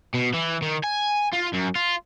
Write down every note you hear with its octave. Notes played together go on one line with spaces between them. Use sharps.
B2
E3
D#3
G#5
F4
F#2
F4